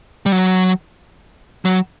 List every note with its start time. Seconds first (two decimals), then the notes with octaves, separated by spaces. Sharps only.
0.26 G3
0.32 F#3
1.65 F#3